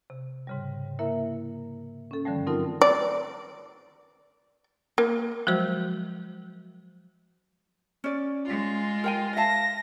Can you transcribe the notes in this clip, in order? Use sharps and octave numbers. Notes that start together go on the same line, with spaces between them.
C3
G#2 C#3 G3
A#3 E4 A#4 E5
C#4 A4
G2 D3 D#3 F3 G3 A3
F#3 A3 C4 D#4 F4 A#4
D5
A#3
F3 F#3 G#3 F#4 C5
C#4 D5
G#3 F4
A#4 G5 G#5
E5 F5 A5 A#6